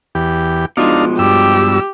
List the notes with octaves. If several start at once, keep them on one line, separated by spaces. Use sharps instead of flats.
E2 G4
B2 F3 G#3 D4 D#4 F5
G2 G4 E6